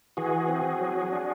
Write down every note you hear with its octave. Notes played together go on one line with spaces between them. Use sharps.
E3 F#4 G#4
C4
F#3
D4